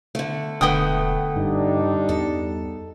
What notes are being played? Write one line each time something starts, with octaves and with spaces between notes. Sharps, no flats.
D3 A3
E1 D3 A3 B3 G5 D#6
G2 G3 D4 D#4
E2 A4